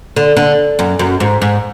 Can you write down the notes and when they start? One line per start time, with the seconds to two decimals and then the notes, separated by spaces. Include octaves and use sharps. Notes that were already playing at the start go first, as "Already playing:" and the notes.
0.16 D3
0.37 D3
0.79 F#2
0.99 F#2
1.20 G#2
1.42 G#2